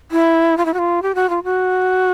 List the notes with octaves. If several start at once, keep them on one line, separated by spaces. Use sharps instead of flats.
E4
F4
E4
F#4
F4
G4
F#4
F4
F#4